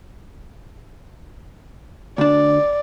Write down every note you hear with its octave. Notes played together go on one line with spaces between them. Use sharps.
D2 D4 D5